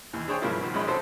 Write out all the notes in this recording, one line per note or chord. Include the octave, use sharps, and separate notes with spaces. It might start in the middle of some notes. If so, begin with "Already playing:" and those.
D#2 E3
D4 G#4 C5 C#5 G5 G#5
G2 C#3 F3 A#3 E4 F5
B2 D#3 F3
A#1 G#3 C#4 D#4 B5
C#3 C4 F#4 A4 C5